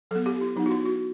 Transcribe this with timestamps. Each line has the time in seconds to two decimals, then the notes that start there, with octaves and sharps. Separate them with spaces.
0.11 F#3 B3 A4
0.26 G4
0.41 E4
0.56 F#3 B3 D#4
0.66 F#4
0.71 E4
0.85 F#4